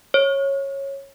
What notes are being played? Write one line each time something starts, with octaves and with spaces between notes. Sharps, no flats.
C#5